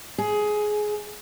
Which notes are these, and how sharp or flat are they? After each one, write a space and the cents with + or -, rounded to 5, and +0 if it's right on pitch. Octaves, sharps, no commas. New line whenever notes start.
G#4 +15